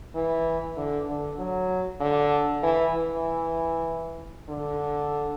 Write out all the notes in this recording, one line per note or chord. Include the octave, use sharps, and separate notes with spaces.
E3
D3
D3
F#3
D3
E3
E3
D3